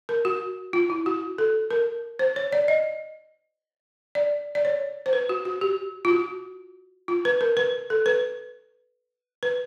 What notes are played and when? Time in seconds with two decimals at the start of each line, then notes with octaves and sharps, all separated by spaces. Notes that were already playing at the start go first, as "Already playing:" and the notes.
0.09 A#4
0.25 F#4
0.73 F4
0.90 E4
1.06 F#4
1.38 A4
1.71 A#4
2.19 C5
2.36 C#5
2.53 D5
2.68 D#5
4.15 D5
4.55 D5
4.65 C#5
5.06 C5
5.13 B4
5.29 F#4
5.45 F#4
5.61 G4
6.05 F4
6.11 F#4
7.08 F4
7.25 B4
7.41 A#4
7.57 B4
7.90 A4
8.06 B4
9.43 B4